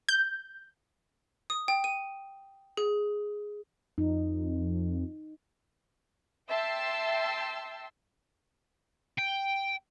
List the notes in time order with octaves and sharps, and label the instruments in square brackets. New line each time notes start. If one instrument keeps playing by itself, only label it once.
[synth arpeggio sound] G6
[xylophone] D#6
G5
D#7
G#4
[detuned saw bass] F2 [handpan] D#4
[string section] E5 G5 A5 C6 E6
[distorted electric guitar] G5